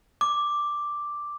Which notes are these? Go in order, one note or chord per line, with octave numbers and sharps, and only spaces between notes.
D6